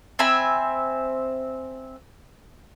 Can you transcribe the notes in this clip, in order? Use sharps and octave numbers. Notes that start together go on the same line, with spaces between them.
C4 E5 G#5 B5